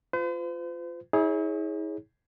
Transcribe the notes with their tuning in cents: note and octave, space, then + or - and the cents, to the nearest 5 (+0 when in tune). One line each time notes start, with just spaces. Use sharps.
F4 -5 C5 -45
E4 -45 G#4 +0 C#5 +0